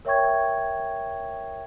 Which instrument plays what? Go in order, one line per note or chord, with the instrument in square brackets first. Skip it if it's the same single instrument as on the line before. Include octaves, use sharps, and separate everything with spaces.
[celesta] A#4 C#5 E5 G5 C#6 G#6